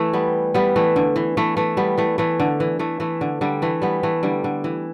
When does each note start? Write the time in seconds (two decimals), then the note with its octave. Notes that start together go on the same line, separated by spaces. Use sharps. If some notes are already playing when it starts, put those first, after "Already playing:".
Already playing: E3 A3
0.13 G3 B3
0.54 G3 B3
0.76 E3 A3
0.96 D3
1.16 E3
1.37 E3 A3
1.57 E3 A3
1.77 G3 B3
1.98 E3 A3
2.18 E3 A3
2.40 D3
2.60 E3
2.79 E3 A3
3.00 E3 A3
3.21 D3
3.41 D3 G3
3.62 E3 A3
3.82 G3 B3
4.03 E3 A3
4.23 D3 G3
4.44 D3
4.64 E3